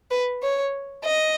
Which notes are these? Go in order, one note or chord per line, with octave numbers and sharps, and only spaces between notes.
B4
C#5
D#5